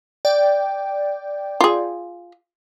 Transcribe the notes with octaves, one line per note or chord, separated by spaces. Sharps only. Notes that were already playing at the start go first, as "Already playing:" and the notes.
D5 G5
F4 G#4